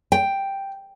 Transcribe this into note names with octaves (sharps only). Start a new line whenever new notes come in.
G5